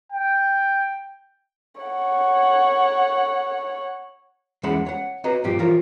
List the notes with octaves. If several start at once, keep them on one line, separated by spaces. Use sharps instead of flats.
G5
C#5 F#5
E2 G#3 C#4 E5 F#5 B5
C#5 F#5
C4 F#4 B4 C#5 D#5 A#5
G2 A#2 F3 G4
E3 F3 F4 A#4 C#5